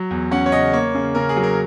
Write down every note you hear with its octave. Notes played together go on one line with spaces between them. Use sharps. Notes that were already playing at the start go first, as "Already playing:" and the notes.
Already playing: F#3
E2
C#4 F#5
C#5
C#3 D#5
A#3 C#5
C#3
C#3 A#4
G#4
F#3
A#4